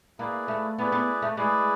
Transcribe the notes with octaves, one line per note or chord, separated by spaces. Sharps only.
A#3 E4 G#4 B4 D5
A3
B3 E4 G#4 B4 D5
B3
A3
G#3 E4 G#4 B4 D5